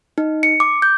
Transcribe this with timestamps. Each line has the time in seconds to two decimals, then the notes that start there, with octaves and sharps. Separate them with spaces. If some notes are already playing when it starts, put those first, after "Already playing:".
0.18 D#4
0.43 C#7
0.60 D6
0.82 G6